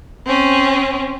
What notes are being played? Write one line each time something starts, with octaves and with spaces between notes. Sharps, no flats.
C4 C#4